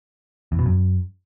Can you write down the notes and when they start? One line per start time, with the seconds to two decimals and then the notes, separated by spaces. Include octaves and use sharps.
0.52 E2
0.59 B2
0.66 F#2